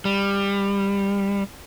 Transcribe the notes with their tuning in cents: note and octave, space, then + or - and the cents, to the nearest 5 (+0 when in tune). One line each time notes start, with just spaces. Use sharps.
G3 +20